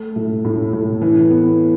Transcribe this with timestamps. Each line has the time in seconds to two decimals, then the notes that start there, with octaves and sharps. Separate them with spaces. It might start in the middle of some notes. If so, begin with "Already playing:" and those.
Already playing: A3
0.16 A2
0.45 A2
0.73 A2
1.01 E3
1.30 B3